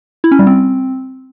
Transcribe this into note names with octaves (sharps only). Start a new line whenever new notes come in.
E4
C#4
G3
C4